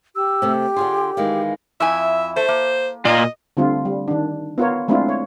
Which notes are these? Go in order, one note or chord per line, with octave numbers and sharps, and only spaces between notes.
G4 E6
C3 A3
D3 F4 G#4 C6
D#3 E3 G#3 F5
F2 E4 E5 G#5
A3 C5
A#3
A#2 F4 D#5
D3 G3 A3 C4 F4
G3
D#3 D4
B3 F4 A#4 C#5
G#3 A3 C4 D4 E4 F4
C#5